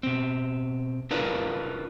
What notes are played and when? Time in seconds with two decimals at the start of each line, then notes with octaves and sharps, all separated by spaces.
0.03 B2 C4
1.11 D4 E4 F4 A#4 B4 D5